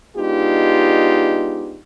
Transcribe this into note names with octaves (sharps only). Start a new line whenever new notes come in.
G#3 B3 D4 D#4 F4 G4